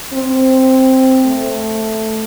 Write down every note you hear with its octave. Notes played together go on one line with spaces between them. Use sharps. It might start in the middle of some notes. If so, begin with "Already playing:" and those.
C4
A3